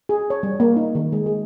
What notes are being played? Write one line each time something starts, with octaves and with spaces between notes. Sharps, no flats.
G#4
C#5
G3
A#3
D#4
D#3
G#3
G#4